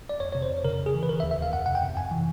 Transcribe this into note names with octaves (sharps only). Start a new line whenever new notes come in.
D5
F2 C#5
C3 C#5
C5
F2
C#3 A#4
C#3
G#4
E3
B4
D#3 A#4
E5
D#2
E5
D#2 F5
F2 F#5
C3 F#5
G5
C3
F#2 G#5
E3